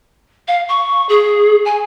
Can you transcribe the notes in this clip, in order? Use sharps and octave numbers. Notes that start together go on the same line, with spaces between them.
F5
C#6
G#4
G#5